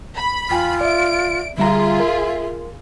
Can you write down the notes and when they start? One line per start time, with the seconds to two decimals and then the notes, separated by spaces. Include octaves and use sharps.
0.16 B5
0.50 E2 F4 G5 G#5
0.81 D5 E5 D7
1.58 D3 G3 F4 G#4 E5 A#5
2.00 A#4